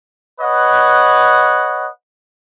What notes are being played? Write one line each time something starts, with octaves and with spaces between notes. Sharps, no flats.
B4 C#5 D#5 F#5